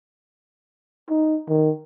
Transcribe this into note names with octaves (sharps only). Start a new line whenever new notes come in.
D#4
D#3